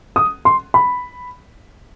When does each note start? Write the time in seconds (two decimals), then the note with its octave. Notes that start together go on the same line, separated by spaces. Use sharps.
0.16 D#6
0.45 C6
0.74 B5